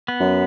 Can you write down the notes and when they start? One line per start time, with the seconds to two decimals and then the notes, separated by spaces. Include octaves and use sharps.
0.08 B3
0.20 F#2